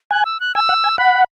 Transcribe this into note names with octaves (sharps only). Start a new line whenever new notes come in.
G#5 F#6
E6
F#6
G#5 E6
F#5
G#5
F#5 B5